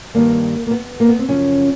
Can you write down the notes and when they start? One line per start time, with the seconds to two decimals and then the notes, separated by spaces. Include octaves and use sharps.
0.14 G2 D#3 G3 A#3
0.67 A#3
0.71 B3
1.00 A#3
1.09 B3
1.19 C4
1.28 F#2 C#3 F3 C#4